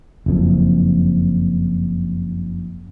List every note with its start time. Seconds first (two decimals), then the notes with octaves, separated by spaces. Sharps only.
0.26 F#1 F2